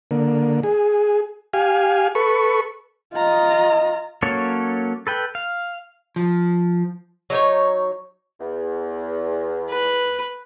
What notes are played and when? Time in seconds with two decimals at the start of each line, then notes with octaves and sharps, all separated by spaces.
0.11 D3 A#3
0.63 G#4
1.53 G4 F5 G#5
2.15 A4 B4 C#6
3.14 F4 D#5 A#5
4.22 F#3 A#3 C#4 A4 C#5
5.07 A4 B4 G5
5.35 F5
6.16 F3
7.30 F#3 D#4 C#5
8.40 E2
9.70 B4